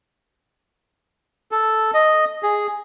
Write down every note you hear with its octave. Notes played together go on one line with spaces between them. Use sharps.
A4
D#5
G#4